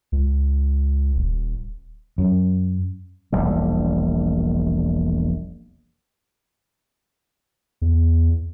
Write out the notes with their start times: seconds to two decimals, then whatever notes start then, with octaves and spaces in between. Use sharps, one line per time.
0.12 C#2
1.16 D#1
2.18 F#2
3.32 E1 A#1 G3
7.82 E2